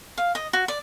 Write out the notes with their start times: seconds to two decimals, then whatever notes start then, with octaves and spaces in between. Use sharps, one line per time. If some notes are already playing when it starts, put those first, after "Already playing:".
0.18 F5
0.35 D#5
0.53 F#4
0.68 D5